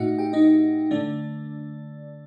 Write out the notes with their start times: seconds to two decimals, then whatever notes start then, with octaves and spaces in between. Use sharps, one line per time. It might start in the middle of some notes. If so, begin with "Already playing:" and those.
Already playing: A2 A3 D#4 F#4 D#5 F#5
0.18 G4 G5
0.33 D#4 D#5
0.91 D3 A3 D4 D5